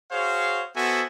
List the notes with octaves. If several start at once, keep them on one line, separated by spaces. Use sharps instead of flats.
F#4 G#4 C5 C#5 F5
B3 F#4 A4 C5 E5 G#5